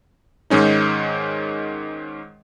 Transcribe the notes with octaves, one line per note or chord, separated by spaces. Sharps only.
G#2 D#3 G#3 C#4 D#4